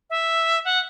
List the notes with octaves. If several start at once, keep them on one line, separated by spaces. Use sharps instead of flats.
E5
F#5